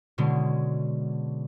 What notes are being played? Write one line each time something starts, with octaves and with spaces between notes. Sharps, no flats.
B2 D3 G#3 C#4